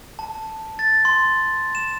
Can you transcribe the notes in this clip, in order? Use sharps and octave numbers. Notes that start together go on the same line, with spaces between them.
A5
A6
C6
E7